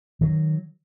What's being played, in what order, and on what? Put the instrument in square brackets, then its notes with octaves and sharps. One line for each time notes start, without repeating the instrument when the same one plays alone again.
[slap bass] D#3 F#3